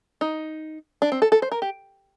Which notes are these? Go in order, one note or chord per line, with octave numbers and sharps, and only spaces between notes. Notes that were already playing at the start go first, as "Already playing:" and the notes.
D#4
D4
C4
A4
A4
C5
A#4
G4